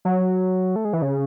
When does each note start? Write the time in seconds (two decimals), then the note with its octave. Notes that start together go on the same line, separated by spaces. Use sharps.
0.05 F#3
0.76 A3
0.85 G#3
0.93 E3
1.02 C#3